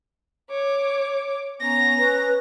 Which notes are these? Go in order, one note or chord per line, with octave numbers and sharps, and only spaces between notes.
C#5 D6
B3 C#4 A#5 A#6
B4